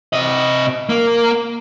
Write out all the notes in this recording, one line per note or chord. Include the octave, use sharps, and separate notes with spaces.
C3 D#5
A#3